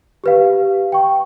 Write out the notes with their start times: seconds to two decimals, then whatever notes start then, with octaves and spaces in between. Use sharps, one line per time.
0.24 G4 B4 F5
0.92 G5 C#6